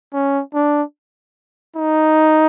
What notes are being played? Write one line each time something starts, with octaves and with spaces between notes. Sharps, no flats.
C#4
D4
D#4